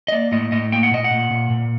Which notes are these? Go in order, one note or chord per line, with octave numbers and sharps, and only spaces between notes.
D#5
A#3 D5
A2 D#5
A2 D#5
A#3 G5
F#5
A#2 D#5
F#5
A#2
A#2
A#2